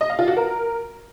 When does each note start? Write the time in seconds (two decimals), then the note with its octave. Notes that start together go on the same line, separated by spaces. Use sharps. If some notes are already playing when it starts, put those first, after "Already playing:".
0.01 D#5
0.10 F5
0.19 F4
0.28 F#4
0.37 A#4